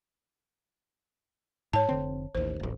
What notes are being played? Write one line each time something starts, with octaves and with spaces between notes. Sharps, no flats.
G#2 C#5 A5
F1 D3 C4
A1 D#2 C5
D1 A1